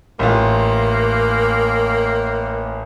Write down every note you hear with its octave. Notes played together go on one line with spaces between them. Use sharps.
A1 A#3 F4